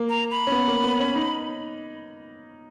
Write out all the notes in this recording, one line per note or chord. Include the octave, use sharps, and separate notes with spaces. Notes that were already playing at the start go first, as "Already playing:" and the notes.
Already playing: A#3
A#5
B5
C#4
B3
A#3
B3
C#4
D#4